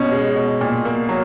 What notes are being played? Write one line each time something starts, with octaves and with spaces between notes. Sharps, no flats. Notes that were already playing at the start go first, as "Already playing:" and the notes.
Already playing: B2 C#4
G#3
B2
A#2
A#3
F#3